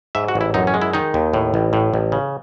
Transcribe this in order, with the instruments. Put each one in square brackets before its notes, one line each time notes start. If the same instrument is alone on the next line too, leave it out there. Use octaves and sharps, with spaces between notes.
[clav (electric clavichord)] G#2 E5
F#4
A1
E4
F#2 D#4
C#4
G#3
E4
D#3 D#4
D#2
A2
A1
A2
A1
C#3